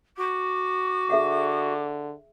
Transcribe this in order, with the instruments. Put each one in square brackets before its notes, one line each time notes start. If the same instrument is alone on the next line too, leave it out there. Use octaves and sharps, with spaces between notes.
[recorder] F#4 [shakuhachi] D6
[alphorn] D3 [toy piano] G#4 E5 F#5